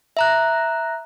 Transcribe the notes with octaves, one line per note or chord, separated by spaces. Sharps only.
E5 A#5 F#6